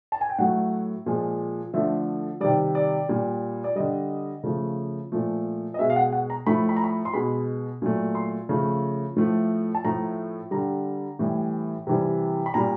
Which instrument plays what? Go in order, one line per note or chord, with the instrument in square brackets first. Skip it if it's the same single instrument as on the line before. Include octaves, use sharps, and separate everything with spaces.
[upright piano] A5
G#5
G5
A2 F#3 A3 F#5
A#2 F3 G#3
D3 F3 A3 E5
C3 D#3 G3 D5
D5
A#2 G3
D5
D3 G3 D#5
C#3 F3 A3
A#2 F3 A3
D#5
B2 G#3 E5
F5
F#5
F#5
A#5
A2 F3 A3 B5
B5
A#5
B5
C6
B2 G#3 B5
A#2 F#3 A3
C6
C#3 F3 A3
A2 F3 A3
A5
A2 F3 A3 A#5
D3 G3 A#5
A2 E3 G3
C3 E3 G3
B5
A#2 G3 A#5